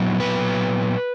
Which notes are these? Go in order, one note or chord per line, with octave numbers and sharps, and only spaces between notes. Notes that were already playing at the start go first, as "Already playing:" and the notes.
Already playing: A#2 F#3 B3 E4
B4